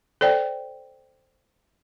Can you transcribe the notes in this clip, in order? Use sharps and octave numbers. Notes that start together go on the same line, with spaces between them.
A4 C5 D5 G5